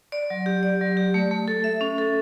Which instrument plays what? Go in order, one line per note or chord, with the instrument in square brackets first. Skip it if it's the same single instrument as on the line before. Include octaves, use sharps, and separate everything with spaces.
[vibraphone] D5
F#3
G4
D5
F#3
G4
A3
A3
A4
E5
C#4
A4